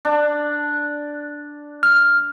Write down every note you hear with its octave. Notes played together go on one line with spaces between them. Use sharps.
D4
F6